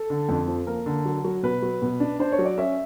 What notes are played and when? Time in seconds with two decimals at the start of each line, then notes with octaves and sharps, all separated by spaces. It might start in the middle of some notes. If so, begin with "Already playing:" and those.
Already playing: A4
0.10 D3
0.29 F2
0.47 F3
0.67 A#3 A#4
0.86 D3
1.05 F#3
1.24 F#3
1.43 B2 B4
1.62 F#3
1.82 B2
2.00 D4
2.19 D4 C5
2.33 C#5
2.39 F#3
2.45 D5
2.58 C#4 E5